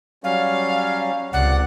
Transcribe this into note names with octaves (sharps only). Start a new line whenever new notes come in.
F#3 G3 C#4 F5
C#2 C3 D5 F#5